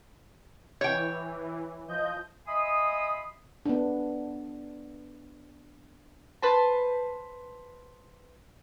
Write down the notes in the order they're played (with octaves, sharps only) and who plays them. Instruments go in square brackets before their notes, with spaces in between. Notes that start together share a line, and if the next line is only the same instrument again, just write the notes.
[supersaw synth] E3 [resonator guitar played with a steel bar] C#5 G5
[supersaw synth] F3 D#5 G6
[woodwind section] D#5 E5 G#5 B5 C6 D#6
[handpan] B3 D4
[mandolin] B4 C5 A5